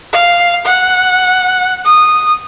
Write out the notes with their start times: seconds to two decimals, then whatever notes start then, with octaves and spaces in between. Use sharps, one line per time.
0.12 F5
0.65 F#5
1.85 D#6